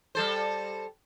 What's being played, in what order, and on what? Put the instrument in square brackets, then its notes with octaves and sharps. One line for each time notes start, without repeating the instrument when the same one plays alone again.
[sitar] G3 A4 C5